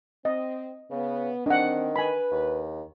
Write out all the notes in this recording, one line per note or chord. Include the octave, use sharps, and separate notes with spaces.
C4 D#5
C#3 B3
D#3 C4 D4 F#5
B4 G#5 B5
D#2